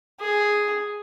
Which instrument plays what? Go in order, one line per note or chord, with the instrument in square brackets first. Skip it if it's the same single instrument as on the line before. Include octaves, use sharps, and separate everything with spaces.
[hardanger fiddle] G#4